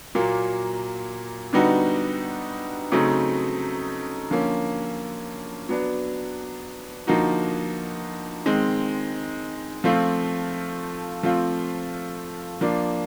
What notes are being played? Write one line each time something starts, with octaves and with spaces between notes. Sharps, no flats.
A#2 F#3 A#3
D3 G3 B3 D#4 F#4
C#3 F#3 A3 C4 D#4
D3 F3 A#3 C#4
F#3 B3 D4
D3 F3 A#3 D#4 F#4
D#3 G#3 C4
F3 A3 C4 F4
F3 A3 C4 F4
F3 A#3 D4